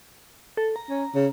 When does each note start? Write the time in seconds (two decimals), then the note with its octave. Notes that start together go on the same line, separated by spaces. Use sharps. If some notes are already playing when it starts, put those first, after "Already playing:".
0.57 A4
0.76 A#5
0.89 C#4
1.15 C#3